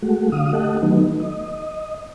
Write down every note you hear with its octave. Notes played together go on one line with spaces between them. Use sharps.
G#3 A3 F#4
D3 F5 D#6
A3 G4 A4 D#5 F#5
D#3 F#3 A3 B3 D#4
D#5